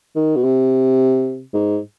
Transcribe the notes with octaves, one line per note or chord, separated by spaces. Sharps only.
D#3
B2
C3
G#2